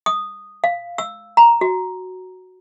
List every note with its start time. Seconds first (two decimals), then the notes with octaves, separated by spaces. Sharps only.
0.06 D#6
0.64 F5
0.98 E6
1.37 A#5
1.61 F#4